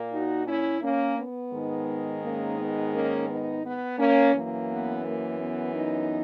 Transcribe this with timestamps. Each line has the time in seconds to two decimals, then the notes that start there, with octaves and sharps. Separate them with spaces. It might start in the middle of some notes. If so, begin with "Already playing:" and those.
Already playing: A#2 A#3
0.12 D#4 F#4
0.47 C#4 E4
0.82 A#3 C#4
1.17 B3
1.52 G#2 D#3 G#3
2.23 A#3 C#4
2.58 B3
2.93 A#3 C#4
3.28 B3 D#4
3.64 B3
3.98 A#3 C#4
4.34 F#2 E3 A#3
4.70 B3
5.04 A#3
5.39 B3
5.74 B3 D#4